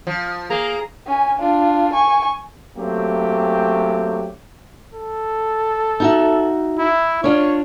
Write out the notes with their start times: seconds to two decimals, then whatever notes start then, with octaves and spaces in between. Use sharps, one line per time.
0.07 F3
0.50 A#3 G#4 A#5
1.07 C#4 G#5
1.39 D4 F4
1.93 G#5 C#6
2.77 F#3 A3 A#3 C4 C#4 G4
4.93 A4
6.00 D#4 F#4 E5
6.78 E4
7.24 C#4 D4 F4 C#5